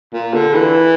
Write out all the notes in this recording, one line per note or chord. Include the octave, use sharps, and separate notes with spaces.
A#2
D3
E3